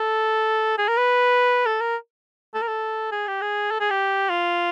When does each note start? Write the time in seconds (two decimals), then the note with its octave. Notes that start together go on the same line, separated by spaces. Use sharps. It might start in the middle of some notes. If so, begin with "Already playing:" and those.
Already playing: A4
0.78 G#4
0.88 A#4
0.98 B4
1.66 A4
1.81 A#4
2.54 A4
2.62 A#4
2.68 A4
3.12 G#4
3.27 G4
3.41 G#4
3.71 A4
3.80 G#4
3.90 G4
4.29 F4